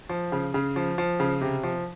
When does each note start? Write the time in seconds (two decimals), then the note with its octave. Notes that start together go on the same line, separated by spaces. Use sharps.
0.09 F3
0.32 C#3
0.54 C#3
0.76 F3
0.98 F3
1.20 C#3
1.41 C3
1.63 F3